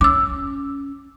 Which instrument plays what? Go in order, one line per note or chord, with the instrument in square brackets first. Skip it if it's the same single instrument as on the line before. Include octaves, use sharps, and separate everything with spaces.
[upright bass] C#4 [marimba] D6 E6